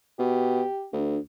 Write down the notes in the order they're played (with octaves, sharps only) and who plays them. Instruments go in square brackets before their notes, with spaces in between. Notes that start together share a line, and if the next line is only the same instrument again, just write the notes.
[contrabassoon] B2 [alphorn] G4
[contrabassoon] D2 [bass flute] D4